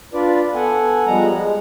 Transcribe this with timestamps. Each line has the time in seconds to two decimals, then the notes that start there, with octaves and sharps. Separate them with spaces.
0.14 D4 F4 B4 D5
0.54 B3 A4 F#5 G#5
1.06 F3 G3 G#3 F#5 A#5
1.33 G#3